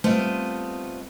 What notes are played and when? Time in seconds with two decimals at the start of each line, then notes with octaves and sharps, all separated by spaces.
0.04 G3 A3 B3 C4 F4 D#5